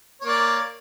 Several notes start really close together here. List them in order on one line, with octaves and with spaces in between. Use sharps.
C#5 A#3 D5